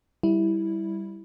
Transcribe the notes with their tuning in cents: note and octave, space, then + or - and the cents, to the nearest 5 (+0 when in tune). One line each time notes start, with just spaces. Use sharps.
G3 +0 E4 -10